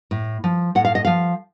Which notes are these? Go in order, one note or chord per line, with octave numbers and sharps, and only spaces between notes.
A2
F3
A2 F#5
F5
D#5
F3 F5